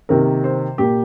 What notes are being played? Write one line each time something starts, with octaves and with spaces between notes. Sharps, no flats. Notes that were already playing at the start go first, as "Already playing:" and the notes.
C3 D#3 A#3 A#4
C5
A#2 A#3 G4